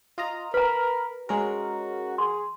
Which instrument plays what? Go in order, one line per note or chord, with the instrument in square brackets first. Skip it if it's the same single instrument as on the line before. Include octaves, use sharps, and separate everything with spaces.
[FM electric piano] F4 D#5 A#5
[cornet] A#4 [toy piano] B4 A#5 [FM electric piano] B5
[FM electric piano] G#3 C#4 A#4 [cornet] F#4
[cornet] G#4 [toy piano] C6